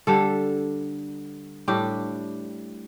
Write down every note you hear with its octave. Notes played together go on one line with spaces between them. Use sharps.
D3 G3 D4 A4
A2 G3 D4 G4